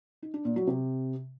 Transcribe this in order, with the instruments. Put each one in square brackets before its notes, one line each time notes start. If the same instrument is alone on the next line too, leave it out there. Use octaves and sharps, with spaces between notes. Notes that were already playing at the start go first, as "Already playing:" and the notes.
[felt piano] D#4
D4
A#2
F#3
C3